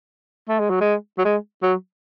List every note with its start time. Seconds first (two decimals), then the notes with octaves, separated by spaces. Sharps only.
0.49 A3
0.59 G#3
0.70 F#3
0.81 G#3
1.18 F#3
1.25 G#3
1.63 F#3